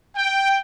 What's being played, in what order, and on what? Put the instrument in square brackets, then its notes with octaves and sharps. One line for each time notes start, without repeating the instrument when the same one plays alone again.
[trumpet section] G5